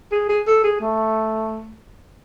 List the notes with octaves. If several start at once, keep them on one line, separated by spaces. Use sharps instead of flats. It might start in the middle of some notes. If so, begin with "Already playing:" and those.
G#4
G#4
A4
G#4
A3